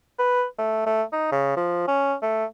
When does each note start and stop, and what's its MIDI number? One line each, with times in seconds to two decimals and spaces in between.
0.19 0.45 71
0.58 0.82 57
0.86 1.03 57
1.12 1.28 63
1.32 1.56 49
1.57 1.86 53
1.88 2.15 61
2.22 2.45 57